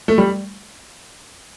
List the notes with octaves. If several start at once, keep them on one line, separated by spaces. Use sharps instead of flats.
A3
G3